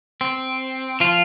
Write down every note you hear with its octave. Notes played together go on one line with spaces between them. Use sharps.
C4
F3 F4